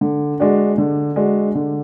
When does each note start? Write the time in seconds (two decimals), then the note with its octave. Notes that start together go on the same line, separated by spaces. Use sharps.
0.01 D3
0.40 G#3 D4 F#4
0.78 D3
1.16 G#3 D4 F#4
1.55 D3